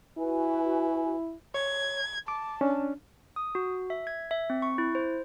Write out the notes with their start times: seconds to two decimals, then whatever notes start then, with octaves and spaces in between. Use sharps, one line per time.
0.18 E4 F#4 B4 G#5
1.54 C#5 G#6
2.28 A5 D6
2.61 C#4 D4
3.36 D#6
3.55 F#4
3.90 E5
4.07 G#6
4.31 E5
4.50 C4
4.62 C#6
4.78 E4
4.95 C5